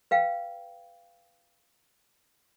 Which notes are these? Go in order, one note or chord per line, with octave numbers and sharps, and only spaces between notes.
B4 F5 G5